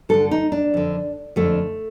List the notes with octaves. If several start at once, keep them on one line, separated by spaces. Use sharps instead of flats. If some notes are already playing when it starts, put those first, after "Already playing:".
G2 D3 A4
D#4
D4
F2 D3
F2 D3 A3